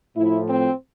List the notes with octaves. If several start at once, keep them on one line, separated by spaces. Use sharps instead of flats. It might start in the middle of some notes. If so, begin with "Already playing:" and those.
A2 F3 E4
C4